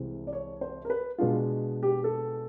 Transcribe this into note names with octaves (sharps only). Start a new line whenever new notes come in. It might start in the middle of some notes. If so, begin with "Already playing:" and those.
Already playing: C2 C3 E3 G#3 C4
D5
C#5
C5
A#4
B4
B2 G#3 B3 D4 F4
G4
A4